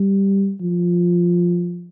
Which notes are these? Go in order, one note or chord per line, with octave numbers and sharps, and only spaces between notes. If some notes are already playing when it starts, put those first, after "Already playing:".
Already playing: G3
F3